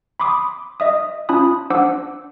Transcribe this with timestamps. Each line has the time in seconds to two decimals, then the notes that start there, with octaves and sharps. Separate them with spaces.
0.20 B5 C6 D6 D#6
0.80 D#5 E5 D#6
1.29 C#4 F4 A5 B5 D#6
1.70 D4 C5 F#5 D6 E6